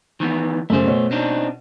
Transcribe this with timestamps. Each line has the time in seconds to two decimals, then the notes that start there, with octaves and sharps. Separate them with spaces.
0.20 D#3 E3 B3
0.70 F#2 C#3 A3 C5
0.86 B2 C#5
1.11 C4 D4 D#4